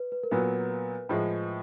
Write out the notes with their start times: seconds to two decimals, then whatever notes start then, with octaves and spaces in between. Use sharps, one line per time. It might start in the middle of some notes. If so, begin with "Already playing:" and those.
Already playing: B4
0.12 B4
0.23 A#4
0.31 A#2 F#3 B3 B4
1.09 A2 F3 G#3